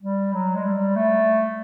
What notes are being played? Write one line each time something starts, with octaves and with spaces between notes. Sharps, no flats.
G3
F#3
G#3
G3
A3